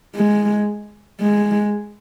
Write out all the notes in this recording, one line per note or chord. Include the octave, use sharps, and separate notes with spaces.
G#3
G#3